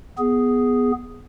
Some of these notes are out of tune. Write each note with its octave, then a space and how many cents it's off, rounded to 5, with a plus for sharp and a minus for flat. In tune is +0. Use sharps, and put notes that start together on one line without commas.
B3 +0 G#4 +0